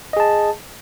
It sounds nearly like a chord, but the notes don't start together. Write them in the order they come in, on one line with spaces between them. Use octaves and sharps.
D#5 G#4 A5